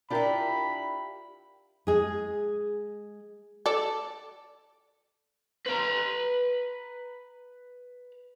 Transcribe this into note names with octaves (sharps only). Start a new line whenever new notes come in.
D4 E4 F4 G4 A#4 B5
G#3 G#4
A4 D5
B4 A#5